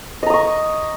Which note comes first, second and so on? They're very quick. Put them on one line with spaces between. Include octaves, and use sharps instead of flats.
D#5 A#5 D#6 C#6